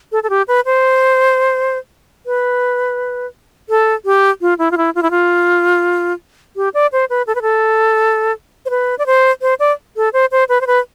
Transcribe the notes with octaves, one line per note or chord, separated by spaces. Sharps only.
A4
A4
G4
B4
C5
B4
A4
G4
F4
E4
F4
E4
F4
E4
F4
G4
D5
C5
B4
A4
B4
A4
C5
B4
D5
C5
C5
D5
A4
C5
C5
B4
C5
B4